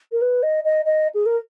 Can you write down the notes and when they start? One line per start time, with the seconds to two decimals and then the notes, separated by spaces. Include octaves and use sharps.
0.12 A#4
0.22 B4
0.43 D#5
0.64 D#5
0.85 D#5
1.14 G#4
1.26 A#4